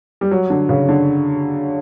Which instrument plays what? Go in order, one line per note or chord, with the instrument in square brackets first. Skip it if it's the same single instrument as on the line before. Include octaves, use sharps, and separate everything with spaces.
[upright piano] G3
F#3
D3
C#3
D3